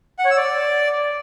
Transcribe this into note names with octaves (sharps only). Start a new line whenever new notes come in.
F#5
C#5
E6
D5